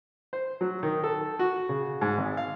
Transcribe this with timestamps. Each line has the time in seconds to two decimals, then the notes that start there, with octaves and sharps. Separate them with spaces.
0.33 C5
0.61 F#3
0.83 D#3
1.04 A4
1.39 F#4
1.69 C#3
2.01 G#2
2.18 G#1
2.37 F5